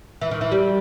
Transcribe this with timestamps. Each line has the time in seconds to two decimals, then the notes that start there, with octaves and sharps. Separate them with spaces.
0.21 E3
0.31 D#3
0.41 E3
0.52 G3